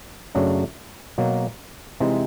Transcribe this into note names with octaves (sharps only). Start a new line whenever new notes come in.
F#2 C#3 F#3 A3 D4
B2 F#3 A#3
C3 E3 G#3 C4 D#4